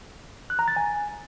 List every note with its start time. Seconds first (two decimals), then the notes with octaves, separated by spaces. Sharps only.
0.50 F#6
0.59 A#5
0.68 A6
0.76 G#5